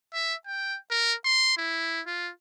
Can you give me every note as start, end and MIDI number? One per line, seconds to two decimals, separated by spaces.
0.13 0.34 76
0.46 0.77 79
0.91 1.14 70
1.25 1.53 84
1.57 2.01 64
2.06 2.31 65